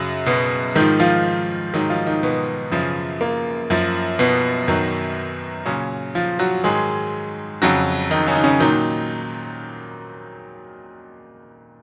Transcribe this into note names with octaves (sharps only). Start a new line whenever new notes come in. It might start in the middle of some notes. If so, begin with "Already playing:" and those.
Already playing: F#2 C#3 F#3
B2 B3
G#2 D#3 F3 D#4
F3 F4
G#2 D#3 F#3 D#4
F3 F4
D#3 D#4
B2 B3
F#2 C#3 F3
A#3
F#2 F3
B2 B3
F#2 D#3 F#3
A#2 C#3 F#3 C#4
F3 F4
F#3 F#4
G#2 D#3 F#3 G#3 G#4
F2 C#3 F#3 F#4
D#3 D#4
C#3 C#4
D#4
C#3 C#4
A#2 D#3 F#3 D#4